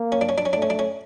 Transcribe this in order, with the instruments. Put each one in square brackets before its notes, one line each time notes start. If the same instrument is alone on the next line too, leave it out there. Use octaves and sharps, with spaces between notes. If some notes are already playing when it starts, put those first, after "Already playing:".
Already playing: [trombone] A#3
[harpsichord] C#4
D4
C#4
D4
C#4
[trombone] A3 [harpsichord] D4
[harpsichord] C#4
D4
C#4